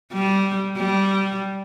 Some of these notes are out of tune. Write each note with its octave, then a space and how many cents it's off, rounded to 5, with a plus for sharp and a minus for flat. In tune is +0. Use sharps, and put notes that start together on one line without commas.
G3 -15
G3 -15